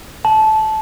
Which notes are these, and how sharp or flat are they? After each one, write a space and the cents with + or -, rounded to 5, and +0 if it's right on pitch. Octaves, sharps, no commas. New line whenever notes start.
A5 -15